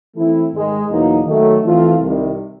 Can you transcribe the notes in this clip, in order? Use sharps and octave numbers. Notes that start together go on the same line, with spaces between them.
E3 A3 C4 E4
G#2 D#3 G#3
E2 B2 F#3 A#3 D#4
D#3 F#3 A3
E3 A3 C4 F4
C2 C3 D#3 G3